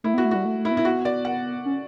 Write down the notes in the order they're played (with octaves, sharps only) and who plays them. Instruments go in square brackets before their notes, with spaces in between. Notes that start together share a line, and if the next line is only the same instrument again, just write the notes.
[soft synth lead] A3 [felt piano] E4
[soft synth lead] B3 [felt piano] F#4
[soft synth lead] A3
[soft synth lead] G3 [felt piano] F#4
[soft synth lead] A3
A3
[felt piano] E4
[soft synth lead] B3
[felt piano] E4
F#4
D5
F#5
[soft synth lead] C#4